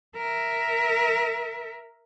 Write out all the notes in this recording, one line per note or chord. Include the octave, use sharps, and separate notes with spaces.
A#4 E5